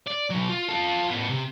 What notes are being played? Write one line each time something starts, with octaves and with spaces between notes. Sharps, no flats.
D5
B2 F#3
F4
F4 A4
A2 B3
C3